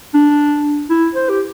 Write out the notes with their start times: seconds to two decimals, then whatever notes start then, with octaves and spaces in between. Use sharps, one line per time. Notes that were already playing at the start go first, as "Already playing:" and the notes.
0.14 D4
0.90 E4
1.15 C5
1.29 G4